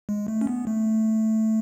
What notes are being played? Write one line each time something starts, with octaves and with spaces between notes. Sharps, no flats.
G#3
A3
C#4
B3
A3